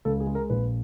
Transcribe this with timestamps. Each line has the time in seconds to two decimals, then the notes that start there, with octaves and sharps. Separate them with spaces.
0.05 C#2 A4
0.20 G#4
0.27 G#3
0.35 A#4
0.50 A#1 B4